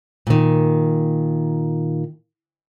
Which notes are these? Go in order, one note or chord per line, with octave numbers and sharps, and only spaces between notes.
A#2 D#3